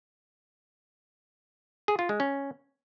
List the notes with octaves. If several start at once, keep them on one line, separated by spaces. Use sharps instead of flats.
G#4
F4
G#3
C#4